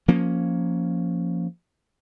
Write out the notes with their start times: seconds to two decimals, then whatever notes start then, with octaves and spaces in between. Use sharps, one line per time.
0.08 F3 A#3 C#4